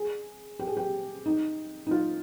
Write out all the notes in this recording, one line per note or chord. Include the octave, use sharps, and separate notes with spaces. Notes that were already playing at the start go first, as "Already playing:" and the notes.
Already playing: G#4
G4
G#4
G4
D#4
D#4
F4